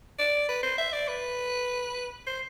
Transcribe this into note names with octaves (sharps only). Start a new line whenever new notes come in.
D5
B4
C5
E5
D5
B4
C5